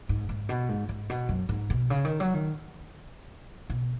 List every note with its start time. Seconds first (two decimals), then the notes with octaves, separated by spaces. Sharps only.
0.09 G#2
0.29 G#2
0.49 B2
0.69 G#2
0.89 G#2
1.10 B2
1.29 F#2
1.49 G#2
1.70 B2
1.90 C#3
2.05 D#3
2.20 F#3
2.34 D#3
3.70 B2